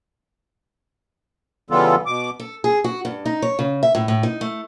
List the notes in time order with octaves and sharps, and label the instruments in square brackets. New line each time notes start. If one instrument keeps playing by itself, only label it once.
[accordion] C#3 E3 G3 B3 F4 A4
B2 D6
[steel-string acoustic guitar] A4
G#4
F#4
G2
D#4
C#5
C#3
E5
A2
A2
D#4
A3